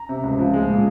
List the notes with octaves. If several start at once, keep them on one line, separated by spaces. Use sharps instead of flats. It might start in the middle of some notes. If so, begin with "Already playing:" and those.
Already playing: A#5
C3
C#2
F3
G#3
A#2